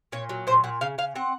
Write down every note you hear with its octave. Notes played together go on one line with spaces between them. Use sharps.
A#2 C#5
F#3
A#2 C5
A#2 F#5
C#3 F5
C#3 F5
C4 F#5